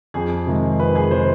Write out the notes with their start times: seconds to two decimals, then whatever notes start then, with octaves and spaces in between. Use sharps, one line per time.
0.14 F2 G#4
0.47 C3 D#3 G#3
0.79 F2 B4
0.95 G#4
1.11 C3 D#3 G#3 C5